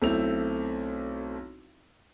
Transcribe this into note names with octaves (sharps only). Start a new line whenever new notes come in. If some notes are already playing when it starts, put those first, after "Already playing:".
B1 A3 C4 E4 F7